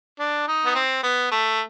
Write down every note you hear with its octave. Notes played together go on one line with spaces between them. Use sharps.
D4
D#4
B3
C4
B3
A3